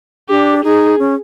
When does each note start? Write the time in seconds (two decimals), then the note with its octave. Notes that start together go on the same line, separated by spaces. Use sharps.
0.29 D4 G4
0.64 D#4 G#4
0.99 C#4